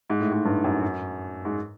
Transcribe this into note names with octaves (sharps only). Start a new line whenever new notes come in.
G#2
A2
G#2
G2
F#2
G#2